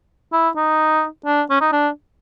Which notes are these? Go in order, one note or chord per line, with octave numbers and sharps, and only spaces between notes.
E4
D#4
D4
C#4
D#4
D4